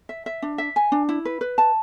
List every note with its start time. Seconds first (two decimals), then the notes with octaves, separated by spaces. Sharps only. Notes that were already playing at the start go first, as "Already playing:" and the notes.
0.09 E5
0.26 E5
0.42 D4
0.58 E5
0.76 G#5
0.92 D4
1.09 E4
1.25 B4
1.41 B4
1.58 A5